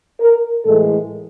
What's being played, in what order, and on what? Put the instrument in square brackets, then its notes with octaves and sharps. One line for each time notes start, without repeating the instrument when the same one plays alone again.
[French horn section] A#4
A2 E3 G#3 A4